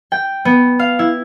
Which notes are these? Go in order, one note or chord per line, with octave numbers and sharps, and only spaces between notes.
G5
B3
F5
E4